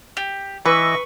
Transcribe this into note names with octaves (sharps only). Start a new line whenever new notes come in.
G4
E3 B4 D#5 E5 C#6